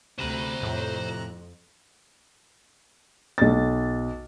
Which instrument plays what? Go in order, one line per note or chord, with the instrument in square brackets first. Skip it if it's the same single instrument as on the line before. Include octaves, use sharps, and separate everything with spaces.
[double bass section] D2 [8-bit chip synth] C3 A#5 F#6 [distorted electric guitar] C5 B5
[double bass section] F2 [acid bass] A2
[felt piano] B1 A6